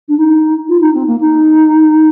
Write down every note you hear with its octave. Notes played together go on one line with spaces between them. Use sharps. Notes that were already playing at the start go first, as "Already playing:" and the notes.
D4
D#4
F4
D#4
C4
A#3
D#4